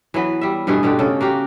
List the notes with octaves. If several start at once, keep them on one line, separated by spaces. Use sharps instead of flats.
E3 F#3 B3
G3 E5
G2 B2 A3 G#4
B2 D3 G4
C#3 A4
A#3 F#4 G4